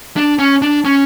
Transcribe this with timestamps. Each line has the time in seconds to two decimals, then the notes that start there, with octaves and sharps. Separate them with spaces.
0.17 D4
0.39 C#4
0.62 D4
0.85 C#4